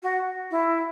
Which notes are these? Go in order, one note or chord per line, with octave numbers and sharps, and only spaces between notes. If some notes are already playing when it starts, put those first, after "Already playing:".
F#4
E4